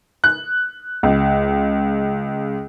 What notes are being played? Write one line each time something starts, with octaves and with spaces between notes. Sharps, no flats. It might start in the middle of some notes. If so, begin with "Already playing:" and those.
F#6
C#2